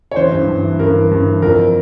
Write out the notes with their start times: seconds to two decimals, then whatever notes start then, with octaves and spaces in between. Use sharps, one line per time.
0.11 C#5
0.16 E3 C5
0.32 G2
0.48 G2
0.63 E3
0.79 G2 A#4
0.96 E3
1.11 G2
1.26 E3
1.42 F2 A#4